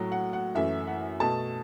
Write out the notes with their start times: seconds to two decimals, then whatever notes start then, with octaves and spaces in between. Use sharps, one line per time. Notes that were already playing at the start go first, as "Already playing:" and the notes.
Already playing: A2 F#3 A3
0.12 F#5
0.33 F#5
0.55 F#2 E3 A3 E5
0.87 F#5
1.20 B2 A3 A5